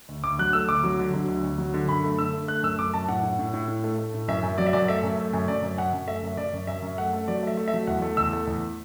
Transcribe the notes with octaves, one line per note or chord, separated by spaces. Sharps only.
D2
D2 D6
F#3 F#6
A3 E6
D2 D6
F#3
D3
F#3
D2
D2
F#3
D3
F#2 B5
A3
D3 E6
A3
A3 F#6
F#2 E6
F#2 D6
F#2 A5
A2 F#5
A2
A2
A2
A2
A3
A3
A2
F#2 E5
F#2
F#3 D5
E5
F#2 D5
A3 E5
F#2
A3
F#2
F#2 D5
F#2
F#2 F#5
F#2
A3 E5
F#2
F#2 D5
F#2
F#2 E5
F#2
A3 F#5
A3
F#3 D5
A3 E5
A3
E5
F#3
E2 F#5
A3
E2 E6
A3
E2